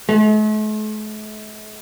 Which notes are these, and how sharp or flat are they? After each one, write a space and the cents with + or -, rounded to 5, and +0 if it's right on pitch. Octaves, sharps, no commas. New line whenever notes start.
A3 -45